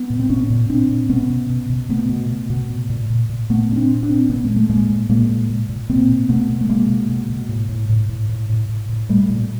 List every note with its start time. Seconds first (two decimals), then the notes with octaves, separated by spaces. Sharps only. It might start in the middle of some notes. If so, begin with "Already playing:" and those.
Already playing: B3
0.10 A#2
0.20 C4
0.30 A#2 B3 C#4
0.50 A#2
0.70 A#2 C4 D4
0.90 A#2
1.09 B2 B3 C#4
1.30 B2
1.50 B2
1.70 B2
1.89 B2 A3 B3
2.09 B2
2.30 B2
2.50 B2
2.70 A#2
2.90 A#2
3.10 A#2
3.29 A#2
3.49 A#2 A3 B3
3.69 A#2 C#4
3.76 C4 D4
3.89 A#2
4.03 C4 D4
4.09 A#2
4.29 A#2 B3 C#4
4.44 G#3
4.49 A#2
4.56 A3
4.69 A#2 G#3 A#3
4.90 A#2
5.09 A#2 G#3 A#3
5.29 A#2
5.50 A#2
5.69 A#2
5.89 B2 A#3 C4
6.09 B2
6.29 B2 A3 B3
6.50 B2
6.61 A3
6.69 B2 G#3 A#3
6.90 B2
7.10 B2
7.30 B2
7.49 A2
7.69 A2
7.89 A2
8.09 A2
8.29 A2
8.50 A2
8.69 A2
8.89 A2
9.09 A#2 G3 A3
9.29 A#2